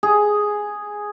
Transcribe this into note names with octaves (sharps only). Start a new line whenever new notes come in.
G#4